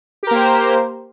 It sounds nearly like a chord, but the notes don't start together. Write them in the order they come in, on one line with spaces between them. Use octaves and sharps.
G4 A#4 A#3 C5